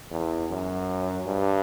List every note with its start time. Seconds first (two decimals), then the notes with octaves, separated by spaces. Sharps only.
0.11 E2
0.49 F#2
1.26 G2